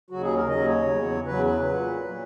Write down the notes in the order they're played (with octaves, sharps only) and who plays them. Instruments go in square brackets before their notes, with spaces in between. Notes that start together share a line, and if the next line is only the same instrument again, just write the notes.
[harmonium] D#2 C#3 F#3 F#4
G#4
A#4
D#2 C#3 F#3 D#5
C#5
E2 C#3 F#3
E2 C#3 F#3 B4
B4
A#2 F#3
A#2 F#3